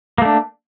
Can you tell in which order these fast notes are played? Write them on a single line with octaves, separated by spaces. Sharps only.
A#3 A3 D4